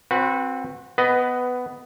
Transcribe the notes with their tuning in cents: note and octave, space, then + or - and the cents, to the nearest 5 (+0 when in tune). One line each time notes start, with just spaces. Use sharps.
C4 +10 F#4 -25 B4 +0
B3 +15 B4 +5 D#5 +0